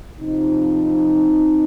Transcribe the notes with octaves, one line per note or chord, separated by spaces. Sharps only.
C3 F3 C4 D#4